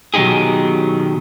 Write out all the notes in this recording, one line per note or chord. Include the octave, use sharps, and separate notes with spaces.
B2 D#3 F#3 D#4 G4 G#4